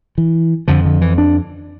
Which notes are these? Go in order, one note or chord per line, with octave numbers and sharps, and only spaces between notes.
E3
F2 D3 F3
D3
E3
D4